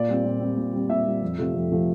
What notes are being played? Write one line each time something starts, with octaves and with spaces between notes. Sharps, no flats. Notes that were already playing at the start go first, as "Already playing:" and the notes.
Already playing: A#2 D5
G3 C4
A#2
G3 C4
A#2
G3 C4
A#2 E5
G3 C4
F2
C3 F3 A3 C4
F2
C3 F3 A3 C4